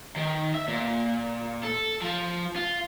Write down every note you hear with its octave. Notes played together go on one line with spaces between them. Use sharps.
D#3
E5
A#2
A4
F3
F4